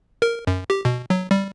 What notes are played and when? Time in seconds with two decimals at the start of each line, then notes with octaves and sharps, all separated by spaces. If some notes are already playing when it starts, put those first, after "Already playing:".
0.22 A#4
0.47 F#2
0.70 G4
0.85 B2
1.10 F#3
1.31 G3